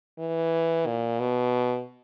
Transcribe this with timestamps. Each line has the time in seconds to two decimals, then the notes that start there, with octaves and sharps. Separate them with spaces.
0.19 E3
0.86 A#2
1.20 B2